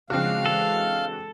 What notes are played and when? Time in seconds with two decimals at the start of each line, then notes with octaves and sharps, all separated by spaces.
0.10 C#3 F3 G#3 C4 D4 F#4 F5
0.46 E3 G#3 A4